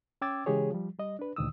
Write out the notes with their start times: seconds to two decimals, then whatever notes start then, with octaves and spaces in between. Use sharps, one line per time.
0.22 C#4 G5 D6 E6 G#6 A6
0.46 C#3 E3 G#3 G4 G#4 C#5
0.71 F3 G3
0.99 G3 D#5
1.19 D4 B4
1.36 D2 A#2 D#3 D#6 E6